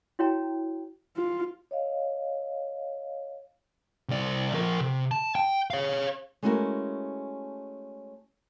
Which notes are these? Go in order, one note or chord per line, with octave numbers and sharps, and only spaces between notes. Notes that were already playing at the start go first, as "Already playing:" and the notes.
E4 F#4 C#5 G5 A#5
F4
C#5 D#5 F5
C2 D5
F3 A#4
C3
A5
G5
C#5 F5
G#3 A3 C#4 E4 F#4 A#4